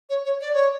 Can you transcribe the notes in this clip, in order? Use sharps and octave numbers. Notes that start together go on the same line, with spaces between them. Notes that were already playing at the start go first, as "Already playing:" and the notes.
C#5
C#5
D5
C#5